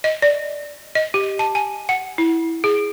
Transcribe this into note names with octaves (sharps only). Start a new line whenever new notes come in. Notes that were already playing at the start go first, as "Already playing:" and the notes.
D#5
D5
D#5
G4
A5
G#5
F#5
E4
G#4